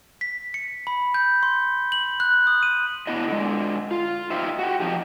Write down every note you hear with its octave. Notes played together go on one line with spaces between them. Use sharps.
B6
C#7
B5
G6
C6
F#7
F#6
D#6
D#7
B3 D4 E4 D#5
D3 G#3
F4
D#4 F4 G4 C5 E5
F#4 G4
F2 F3 D#4 G4